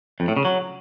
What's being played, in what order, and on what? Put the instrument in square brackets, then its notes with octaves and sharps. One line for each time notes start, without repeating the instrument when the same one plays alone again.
[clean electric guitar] F2
A2
C#3
F#3